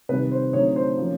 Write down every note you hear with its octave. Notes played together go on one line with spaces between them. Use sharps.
C3 D#3 G3 B4
C5
D3 F#3 A3 C4 D#4 C#5
C5
F3 A#3 C#4